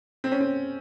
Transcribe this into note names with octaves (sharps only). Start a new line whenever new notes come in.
C4
C#4
C4